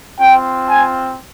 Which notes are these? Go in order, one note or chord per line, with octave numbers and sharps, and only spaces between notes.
C4 F4 G5
G#5